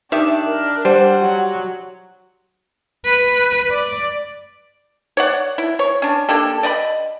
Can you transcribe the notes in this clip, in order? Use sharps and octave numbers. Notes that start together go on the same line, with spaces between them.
D#3 D4 G4 E5
A#4
G3 C5 F#5
F#3
B4
D5
C#5 D5 F#5
E4
C#5
C#4 D4
A#3 D4 G4 A4
D5 D#5 F#5 B5